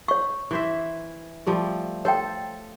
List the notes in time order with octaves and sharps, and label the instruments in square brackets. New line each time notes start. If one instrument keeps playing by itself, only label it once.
[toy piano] C#5 C#6
[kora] E3 C5 E5
F3 G3 A3
[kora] A4 C5 [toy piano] C#5 G5